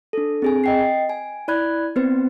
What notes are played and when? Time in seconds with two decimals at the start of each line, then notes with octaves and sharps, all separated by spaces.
0.13 D4 A4
0.42 C4 G#4 G#5
0.64 D#5 G5 C7
1.09 G#5
1.48 E4 D5 B5 F#6 G#6
1.96 B3 C4 B4 C5